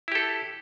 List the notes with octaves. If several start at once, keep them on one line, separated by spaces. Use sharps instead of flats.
E4 G4 A4